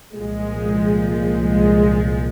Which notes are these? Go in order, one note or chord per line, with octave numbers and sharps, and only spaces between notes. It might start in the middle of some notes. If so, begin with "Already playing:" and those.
C2 A#2 F3 G#3
G#3